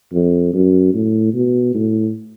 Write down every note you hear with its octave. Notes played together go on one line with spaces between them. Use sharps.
F2
F#2
A2
B2
A2